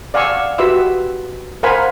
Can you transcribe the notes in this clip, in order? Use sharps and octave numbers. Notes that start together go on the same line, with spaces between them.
D5 F5 F#5 G#5 C#6 E6
F#4 G4 B4 E5 C6 E6
A#4 C5 F5 F#5 G#5 B5